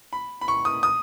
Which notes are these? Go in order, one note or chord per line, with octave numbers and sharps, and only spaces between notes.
B5
B5
C#6
D#6
D#6